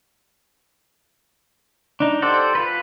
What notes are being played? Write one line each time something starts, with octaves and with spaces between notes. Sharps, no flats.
D4 D#4
G4 A4 C5 D5 F#5
F4 B4